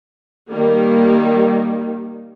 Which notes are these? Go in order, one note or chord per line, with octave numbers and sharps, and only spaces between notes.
D#3 G3 A#3